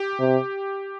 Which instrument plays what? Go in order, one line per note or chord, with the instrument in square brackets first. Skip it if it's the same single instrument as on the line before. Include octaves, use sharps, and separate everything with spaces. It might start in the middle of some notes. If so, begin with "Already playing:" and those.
Already playing: [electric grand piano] G4
[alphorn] C3